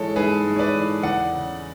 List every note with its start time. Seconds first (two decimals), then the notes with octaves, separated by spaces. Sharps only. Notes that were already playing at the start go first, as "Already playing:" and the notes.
Already playing: G#2 E3 G#3 A4 C#5
0.16 G#2 G#4 B4
0.45 G#2
0.56 C#5
0.59 B4 D5
0.75 E3
1.03 E2 D5 F#5
1.33 C#3